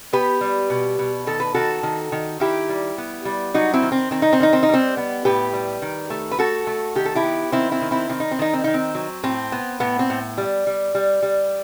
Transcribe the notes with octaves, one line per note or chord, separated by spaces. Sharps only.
B3 G4 B4
G3
B2
B2
D#3 A4
B4
D#3 F#4 A4
D#3
D#3
D#3 E4 G4
G3
B3
G3
F#3 D#4 F#4
C4 E4
D#3
C4
D#3 C4
D#4
C4
D#3 D#4
C4
D#4
G3 C4
B3
A2 G4 B4
G3
D#3
A3
B4
A3 F#4 A4
A3
D#3 G4
A4
E4 G4
B3
D#3 C4 E4
C4 E4
D#3
C4 E4
D#3 C4
D#4
C4
D#3 D#4
C4
D#3 D#4
C4
F#3
A2 C4
B3
A2 B3
C4
A2
G3
G3
G3
G3